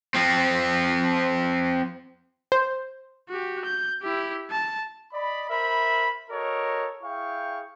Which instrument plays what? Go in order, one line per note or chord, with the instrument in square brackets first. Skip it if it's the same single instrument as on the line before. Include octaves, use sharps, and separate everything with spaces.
[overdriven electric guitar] F3 C4
[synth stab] C5
[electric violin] F#4 G4
G6
E4 G4
A5
[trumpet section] D5 D#5 B5
A#4 C5 E5 B5
F#4 A4 A#4 C#5 D#5
E4 G#4 F5 G5 C#6